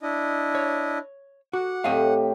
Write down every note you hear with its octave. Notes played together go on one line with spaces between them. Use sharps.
D4 E4 D#5
C#5
F#4 F#5 D6
A2 C4 G4 A4 D#5 F5